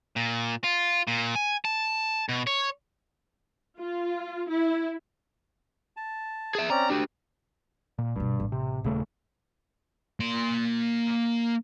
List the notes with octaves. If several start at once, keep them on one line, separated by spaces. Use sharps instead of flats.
A#2
F4
A#2
G#5
A5
B2
C#5
F4
E4
A5
G#4 E5
C4 C#4 D5 A#5
D4 F#4 G4
A#2
D2 G2 B2
A1
C3
D#1 D#2 C#3 A3
A#3 C6